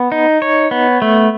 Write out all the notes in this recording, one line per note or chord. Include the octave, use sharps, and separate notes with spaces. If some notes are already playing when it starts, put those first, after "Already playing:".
Already playing: B3
D#4
C#5
B3
A3